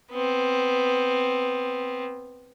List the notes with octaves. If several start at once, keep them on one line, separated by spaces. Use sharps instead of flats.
B3 C4